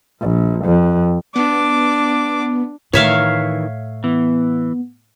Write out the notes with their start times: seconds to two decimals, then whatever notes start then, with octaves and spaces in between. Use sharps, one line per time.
0.21 A#1
0.65 F2
1.36 B3 D4 D6
2.93 A2 D#3 E3 C#5 E5 F5
4.04 E3 B3